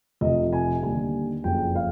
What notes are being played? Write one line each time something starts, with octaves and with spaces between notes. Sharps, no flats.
F1 F2 C3 F3 D#5
G#5
D#2 D3 G3 G#5
F#1 F2 C#3 F#3 G5
F5